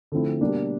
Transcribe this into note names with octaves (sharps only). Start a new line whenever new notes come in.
D3 F3 A3 C4 E4
B2 G3 A#3 D4